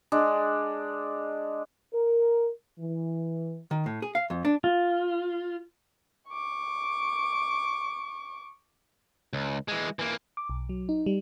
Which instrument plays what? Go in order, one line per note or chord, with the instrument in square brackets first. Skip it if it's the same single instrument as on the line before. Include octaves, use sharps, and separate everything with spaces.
[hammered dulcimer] G#3 D4
[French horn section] A#4
E3
[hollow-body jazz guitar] D#3
A2
G#4
F5
F2
D4
[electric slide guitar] F4
[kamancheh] C#6 D6
[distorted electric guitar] C#2
E3 G#3
E3 A#3
[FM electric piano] D6
B1
F#3
D#4
G3